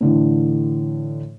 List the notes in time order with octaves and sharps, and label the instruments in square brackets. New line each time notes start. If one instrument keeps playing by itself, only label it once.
[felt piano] A2 D3 E3